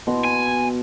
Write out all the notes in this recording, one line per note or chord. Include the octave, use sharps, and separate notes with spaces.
B2 C6
G#5